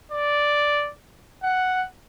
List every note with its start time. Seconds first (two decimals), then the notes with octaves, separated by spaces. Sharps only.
0.12 D5
1.43 F#5